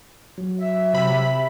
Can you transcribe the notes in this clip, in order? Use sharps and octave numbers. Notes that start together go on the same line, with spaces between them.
F#3
E5
C3 B5